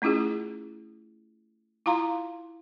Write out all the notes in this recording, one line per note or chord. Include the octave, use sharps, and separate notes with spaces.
A3 C#4 E4 F4 G#4
E4 F4 F5 A#5 C6